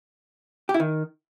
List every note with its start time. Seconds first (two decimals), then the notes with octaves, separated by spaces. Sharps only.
0.69 G4
0.74 E4
0.80 D#3